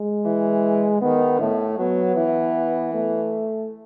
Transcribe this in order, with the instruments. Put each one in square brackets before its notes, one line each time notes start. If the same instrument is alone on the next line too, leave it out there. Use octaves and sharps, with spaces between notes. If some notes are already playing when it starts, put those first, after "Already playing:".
Already playing: [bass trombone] G#3
[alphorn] E3
[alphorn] D#3 [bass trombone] B3
[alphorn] A2 [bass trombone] A3
[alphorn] F#3 [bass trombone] B3
[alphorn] E3
[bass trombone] A3